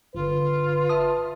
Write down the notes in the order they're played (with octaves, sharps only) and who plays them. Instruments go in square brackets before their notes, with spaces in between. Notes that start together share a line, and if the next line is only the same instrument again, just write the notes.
[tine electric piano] G1 D3 [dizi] F4 [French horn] B4
[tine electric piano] E5 A5 D#6